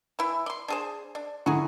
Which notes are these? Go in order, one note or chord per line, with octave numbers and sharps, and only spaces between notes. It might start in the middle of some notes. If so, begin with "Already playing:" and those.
E3 E4
D5 C6
D4 G#4 C5
D4
D3 E4 F#4 G#4 A#5